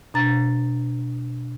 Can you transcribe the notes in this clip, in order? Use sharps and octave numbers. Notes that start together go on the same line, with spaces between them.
B2 D4 A#5 A6